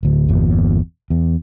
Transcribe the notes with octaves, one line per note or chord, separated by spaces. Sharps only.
D1 D2
G1 E2 A#2
E2